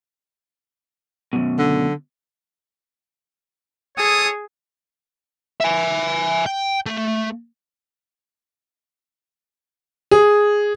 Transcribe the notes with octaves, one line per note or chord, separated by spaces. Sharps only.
F#2 B2
D3
G#4 A4 C#5 D#6
E5 G#5
G5
A3
G#4